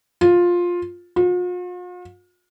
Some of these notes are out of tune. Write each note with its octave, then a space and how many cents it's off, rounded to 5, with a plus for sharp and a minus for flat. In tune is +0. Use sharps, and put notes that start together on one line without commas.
F4 +10
F4 +45